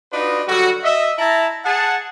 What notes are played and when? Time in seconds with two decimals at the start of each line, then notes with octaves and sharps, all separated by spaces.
0.13 D4 D#4 F4 F#4 B4 D#5
0.48 D3 F#3 G3 F#4
0.84 D#5 E5
1.18 E4 A5 A#5
1.65 G#4 F#5 A5